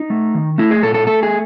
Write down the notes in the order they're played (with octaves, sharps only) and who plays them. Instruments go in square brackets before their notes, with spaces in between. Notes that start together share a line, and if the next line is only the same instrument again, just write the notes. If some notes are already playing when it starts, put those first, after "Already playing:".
Already playing: [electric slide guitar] D#4
A3
D#3
A3 E4
G#4
A#2 A4
A4
A3 A4
G#4